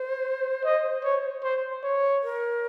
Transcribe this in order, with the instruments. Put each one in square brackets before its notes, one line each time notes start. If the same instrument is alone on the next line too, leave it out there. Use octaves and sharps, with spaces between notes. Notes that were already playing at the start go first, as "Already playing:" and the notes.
Already playing: [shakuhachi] C5
[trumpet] D#5
C#5
C5
C#5
[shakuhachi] A#4